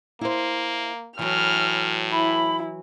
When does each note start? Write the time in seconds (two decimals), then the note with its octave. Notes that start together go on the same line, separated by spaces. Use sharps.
0.21 A#3 E4 C5
1.19 A2 E3 F#3 F6
2.12 E4 B5